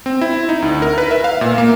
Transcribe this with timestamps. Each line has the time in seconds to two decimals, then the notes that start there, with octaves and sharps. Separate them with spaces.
0.06 C4
0.21 E4
0.49 D#4
0.62 D2
0.82 A#4
0.98 B4
1.11 E5
1.24 F5
1.41 A#2
1.58 A#3